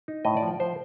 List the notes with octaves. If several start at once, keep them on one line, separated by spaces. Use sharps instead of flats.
D#4
A2 D#5
D5
F3
F3 C5